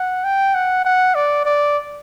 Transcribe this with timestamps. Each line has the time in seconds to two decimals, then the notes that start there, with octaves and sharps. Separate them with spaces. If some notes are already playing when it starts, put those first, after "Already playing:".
Already playing: F#5
0.24 G5
0.54 F#5
0.85 F#5
1.15 D5
1.45 D5